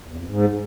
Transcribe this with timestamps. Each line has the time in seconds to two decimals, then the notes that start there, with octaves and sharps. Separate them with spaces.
0.08 E2
0.18 F2
0.28 G#2